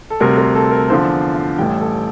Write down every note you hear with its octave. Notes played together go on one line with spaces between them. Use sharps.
A4
D2 C3 G3 A#4
A#4
A4
A#4
E2 D3 F3 C5
F5
A1 A2 E3 G3 G5
A4